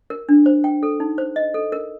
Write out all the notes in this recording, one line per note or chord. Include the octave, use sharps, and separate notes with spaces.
A#4
D4
C5
G5
A4
D#4
C5
D#5
A4
A#4